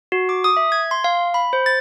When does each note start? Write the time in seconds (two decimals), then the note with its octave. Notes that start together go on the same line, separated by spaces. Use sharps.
0.12 F#4
0.29 D6
0.44 D#6
0.57 E5
0.72 G#6
0.91 C6
1.04 F5
1.34 B5
1.53 C5
1.66 A6